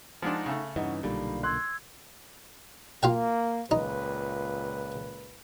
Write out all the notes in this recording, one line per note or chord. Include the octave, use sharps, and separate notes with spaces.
F3 G#3 D4 D#4 F#5
C#3 A3
G2 E3 C#4 D#4 F#5
B1 A#2 D3 G3 D#4 F5 B5
C6 E6 F#6 G#6
A#3 F4 F5 G5
C#2 A#2 D#4 B4